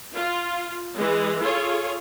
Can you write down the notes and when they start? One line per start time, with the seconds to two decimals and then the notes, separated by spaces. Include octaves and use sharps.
0.13 F4
0.94 E3 G#3
1.41 F4 G#4 A4 C#5